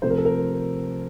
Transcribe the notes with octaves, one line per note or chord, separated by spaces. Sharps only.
C3 F3 A3 C5
A#4
A4
A#4